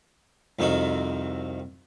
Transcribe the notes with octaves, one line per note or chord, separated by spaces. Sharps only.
C2 F2 D#3 F#4